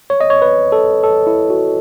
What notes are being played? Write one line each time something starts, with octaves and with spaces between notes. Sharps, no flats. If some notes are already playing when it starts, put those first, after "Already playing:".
C#5
D#5
C#5
B4
A4
A4
E4
F#4